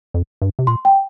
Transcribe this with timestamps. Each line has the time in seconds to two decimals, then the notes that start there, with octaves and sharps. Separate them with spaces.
0.14 F2
0.42 G2
0.59 C3
0.67 A#2 C6
0.85 G5